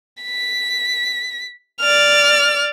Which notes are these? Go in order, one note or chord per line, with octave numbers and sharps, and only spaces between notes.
B6
D5 F6